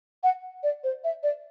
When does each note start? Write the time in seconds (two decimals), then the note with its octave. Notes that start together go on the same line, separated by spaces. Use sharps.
0.23 F#5
0.63 D5
0.84 C5
1.04 E5
1.23 D5